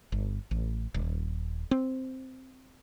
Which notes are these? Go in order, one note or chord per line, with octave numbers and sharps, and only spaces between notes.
G1
A1
D#1
C4